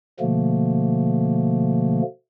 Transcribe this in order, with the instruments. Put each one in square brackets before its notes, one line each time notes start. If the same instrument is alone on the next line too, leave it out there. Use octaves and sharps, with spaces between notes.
[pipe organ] B2 D3 F3 A3 A#3